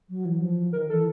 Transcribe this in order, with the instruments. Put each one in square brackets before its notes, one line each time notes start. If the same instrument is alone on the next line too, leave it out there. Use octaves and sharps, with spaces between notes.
[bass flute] F#3
E3
F3
[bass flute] D#3 [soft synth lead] A#4
[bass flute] E3 [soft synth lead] A4